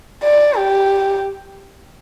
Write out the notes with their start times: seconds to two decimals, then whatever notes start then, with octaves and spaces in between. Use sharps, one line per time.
0.23 D5
0.57 G4